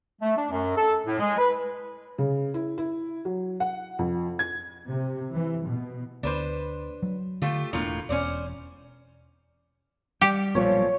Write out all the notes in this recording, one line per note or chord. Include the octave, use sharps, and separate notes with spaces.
A3
D4
F#2
A4
A2
G#3
B4
C#3
E4
E4
F#3
F#5
F2
G#6
C3
E3
B2
D2 D4 B4 C5
F#3
D3 A3 F4 G4
E1 A2 A#3 C4 D4 F4
E1 C#4 C5 D5
G3 G4
B1 A#2 F3 C#5